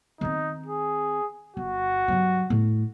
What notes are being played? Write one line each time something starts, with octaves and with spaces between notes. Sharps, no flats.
D#3 C4 D#4
G#4
G1 F#4
G2 F#3
A2